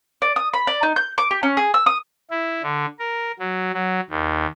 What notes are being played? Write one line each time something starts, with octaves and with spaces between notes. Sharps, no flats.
D5
D#6
B5
D5
D#4
G6
D6
G4
C#4
G#4
E6
D#6
E4
D3
A#4
F#3
F#3
D#2